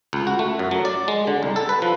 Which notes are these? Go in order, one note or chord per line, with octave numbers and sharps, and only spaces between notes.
C#2
F#4
A3
F#2
F#3
D5
G#3
D3
C2
A4
B4
F3